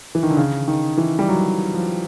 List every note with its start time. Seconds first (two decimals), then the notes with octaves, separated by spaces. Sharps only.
0.15 E3
0.23 D#3
0.30 D3
0.37 C#3
0.68 D#3
0.98 E3
1.19 G3
1.28 F#3
1.74 F3